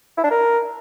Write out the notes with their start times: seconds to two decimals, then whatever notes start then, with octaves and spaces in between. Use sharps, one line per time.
0.17 E4
0.24 D4
0.31 A#4